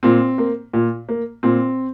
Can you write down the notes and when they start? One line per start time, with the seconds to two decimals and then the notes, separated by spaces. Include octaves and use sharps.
0.03 A#2 C4
0.38 A#3
0.73 A#2
1.09 A#3
1.43 A#2 C4